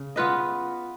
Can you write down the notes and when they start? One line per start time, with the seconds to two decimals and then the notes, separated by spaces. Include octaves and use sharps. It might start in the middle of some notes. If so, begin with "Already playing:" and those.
Already playing: C#3
0.16 B3 F4 B4 D#5